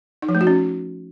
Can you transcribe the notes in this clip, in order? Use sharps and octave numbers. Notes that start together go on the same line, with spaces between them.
D#4
F3
A3
F#4
C#4